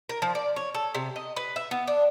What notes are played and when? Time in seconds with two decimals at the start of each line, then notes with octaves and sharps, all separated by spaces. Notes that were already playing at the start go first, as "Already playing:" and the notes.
0.09 A#4
0.22 F3
0.35 D5
0.56 C#5
0.74 A4
0.95 C3
1.16 D#5
1.36 B4
1.56 E5
1.71 B3
1.87 D4